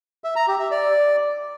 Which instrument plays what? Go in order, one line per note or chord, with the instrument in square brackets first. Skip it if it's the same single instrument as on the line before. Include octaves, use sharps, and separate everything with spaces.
[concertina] E5
A#5
G4
E5
D5